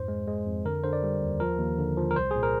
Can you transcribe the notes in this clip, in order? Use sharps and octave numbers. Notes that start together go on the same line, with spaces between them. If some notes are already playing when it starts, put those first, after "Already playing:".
Already playing: F2 G#2 C5
G#3
G#3
F2
D3 A#4
D3 C5
D5
G3
D#2
F3 A#4
D#2
D3
F3
A#4
C2 C5
A#2 G#4
A#4